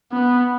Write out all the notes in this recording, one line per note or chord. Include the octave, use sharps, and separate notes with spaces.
B3